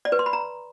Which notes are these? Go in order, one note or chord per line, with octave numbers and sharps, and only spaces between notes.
D5
B4
C6
B5
A#5